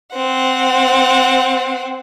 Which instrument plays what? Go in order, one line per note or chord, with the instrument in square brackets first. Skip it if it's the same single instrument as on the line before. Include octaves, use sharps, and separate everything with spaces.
[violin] C4 F#5